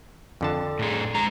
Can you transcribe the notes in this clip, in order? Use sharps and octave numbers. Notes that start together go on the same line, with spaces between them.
F2 D3 A5
A2 G#4
G#3 A#5